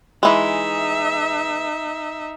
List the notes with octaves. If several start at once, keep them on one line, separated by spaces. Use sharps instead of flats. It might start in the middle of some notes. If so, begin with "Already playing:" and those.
E3 G#3 D#4 E5